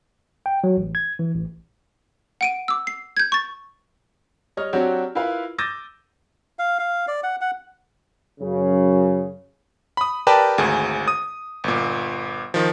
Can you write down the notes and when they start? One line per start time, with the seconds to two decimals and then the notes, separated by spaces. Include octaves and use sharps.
0.46 G5
0.64 F#3
0.77 A1
0.95 G#6
1.19 E3
1.35 A1
2.41 F#5 D7 D#7
2.68 D6 E6
2.87 C7
3.17 G6 G#6
3.32 C#6 A6
4.57 G3 C#5 D#5 F6
4.73 F#3 C4 D4 F#4 G4 C#5
5.15 E4 F4 A#4 B4 F5
5.58 D6 E6 G6 A6 A#6 D#7
6.59 F5
6.79 F5
7.08 D5
7.23 F#5
7.41 F#5
8.40 F#2 C#3
9.97 B5 D#6
10.27 G4 A#4 B4 D5 G5 A5
10.58 G#1 D2 G#4
11.08 D#6 D#7
11.64 G1 A#2
12.54 D#3 F3